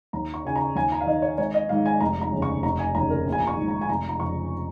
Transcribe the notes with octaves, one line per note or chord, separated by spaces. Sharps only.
D#2 A#5
C#6
C#3 G#5
A#5
D#2 G#5
A#5
F5
D#3 D#5
C#5
G#1 C#5
D#5
G#2 D#3 F5
G#5
F1 A#5
A#5
D#2 C#3
C#6
F1 A#5
G#5
D#2 C#3 A#5
A#4
A#1
G#5
A#5
C#6
G#2 D#3
A#5
G#5
F1 A#5
A#5
F2 C#3 C#6